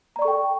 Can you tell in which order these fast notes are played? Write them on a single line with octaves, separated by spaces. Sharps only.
A#5 D5 C#6 A4 G5